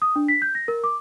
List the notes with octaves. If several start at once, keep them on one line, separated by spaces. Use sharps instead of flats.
D#6
D4
B6
G6
A#6
A#4
D6